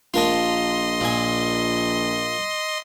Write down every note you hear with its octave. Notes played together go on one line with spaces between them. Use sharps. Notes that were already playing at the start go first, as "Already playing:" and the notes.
A#1 F4 A#4 D#5 A5 C6
A#2 G#5